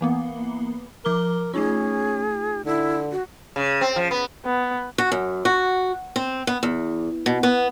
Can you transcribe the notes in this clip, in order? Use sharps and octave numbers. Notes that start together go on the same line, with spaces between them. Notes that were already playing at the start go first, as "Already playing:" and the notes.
E3 A#3 B3
F3 A#4 D6 G7
A3 C#4 D#4 F4 G#4
D3 E4
F#4
C#3
C4
F3
B3
B3
F#4
F#2
F#4
C4
B3
E2
B2
B3